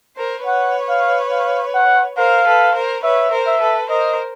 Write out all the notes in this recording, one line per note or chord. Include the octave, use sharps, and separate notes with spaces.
A#4 C5
B4 C#5 F#5
F5
F5
F#5
A#4 C5 F5
A4 B4
A#4 C5
B4 C#5 E5
A#4 C5
E5
A4 B4
A#4 C5 D#5